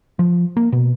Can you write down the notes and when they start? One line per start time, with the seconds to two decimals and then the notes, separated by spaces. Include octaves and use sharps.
0.19 F3
0.57 A#3
0.72 B2